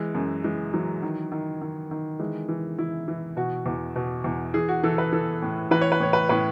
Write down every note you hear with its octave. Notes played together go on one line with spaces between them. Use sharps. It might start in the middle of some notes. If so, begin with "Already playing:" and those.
Already playing: E3 G#3
F#2
E3 G#3
E3 F#3
D#3
D#3
D#3
D#3
E3 G#3
E3
E3 E4
E3
B2 F#4
E2
B2
E2
E3 G#4
F#4
E3 A4
B4
E3 A4
A2
E3 B4
C#5
B4
A2 C#5
B4
A2 B4